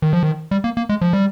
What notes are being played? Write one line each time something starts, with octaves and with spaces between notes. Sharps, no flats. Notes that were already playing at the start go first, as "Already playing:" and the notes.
D#3
F3
D#3
G3
A#3
A#3
G#3
F3
G3